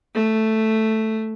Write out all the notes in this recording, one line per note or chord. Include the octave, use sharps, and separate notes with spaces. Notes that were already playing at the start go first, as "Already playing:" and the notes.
A3